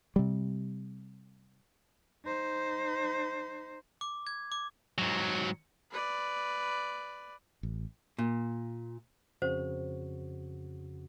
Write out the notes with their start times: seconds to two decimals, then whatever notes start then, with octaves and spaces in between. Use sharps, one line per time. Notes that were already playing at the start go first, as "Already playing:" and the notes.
0.16 C3 G3
2.25 D#4 C5
4.01 D6
4.27 G#6
4.52 D6
4.98 G#2 F#3
5.91 B4 D5
7.63 A1
8.19 A#2
9.42 F2 C#3 F#4 C5